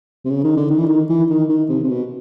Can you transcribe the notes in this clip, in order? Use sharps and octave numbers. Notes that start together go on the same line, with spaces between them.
C3
C#3
D#3
D3
D#3
E3
D#3
E3
D#3
D#3
C3
C3
B2